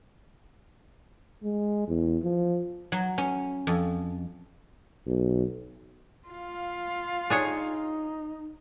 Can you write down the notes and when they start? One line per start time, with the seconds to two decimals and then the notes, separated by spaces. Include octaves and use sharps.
1.43 G#3
1.88 E2
2.23 F3
2.92 F#3
3.18 C#4
3.67 F2
5.07 B1
6.28 F4 F5
7.30 D4 D#4 G#4 C#5